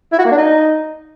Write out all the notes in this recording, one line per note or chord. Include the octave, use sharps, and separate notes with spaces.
E4
F#4
A#3
D4
D#4